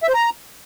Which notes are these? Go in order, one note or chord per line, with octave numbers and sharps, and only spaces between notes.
E5
C5
A#5